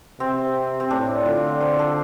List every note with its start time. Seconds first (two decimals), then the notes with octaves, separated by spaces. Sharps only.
0.20 C3 C4
0.80 C4
0.90 A2 D4
1.26 D3 F4
1.61 C5
1.79 A4